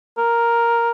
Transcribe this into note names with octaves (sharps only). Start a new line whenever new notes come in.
A#4